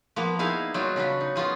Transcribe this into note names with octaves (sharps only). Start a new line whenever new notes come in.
F3 A#3 B3
D#4 E4 G#4 F5
F#3 G3 D#4 F4 F#4
C#3 D4 F#4 B4
D#4
B3 C#4 F4 G#4